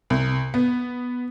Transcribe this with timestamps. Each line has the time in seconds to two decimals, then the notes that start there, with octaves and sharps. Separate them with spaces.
0.10 C2
0.54 B3